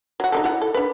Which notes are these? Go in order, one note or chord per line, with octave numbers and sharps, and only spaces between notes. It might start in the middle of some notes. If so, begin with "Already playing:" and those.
F#3 F#4
D#4 G4 A4
E4 F#5
A4
D4 B4